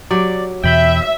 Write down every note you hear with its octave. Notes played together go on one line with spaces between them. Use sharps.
F#3 G4 D5
E2 B2 E3 E5 G5 B5 G6